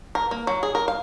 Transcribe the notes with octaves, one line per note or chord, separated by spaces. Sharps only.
A#4
A#3
F#3
G#4
A#4
F5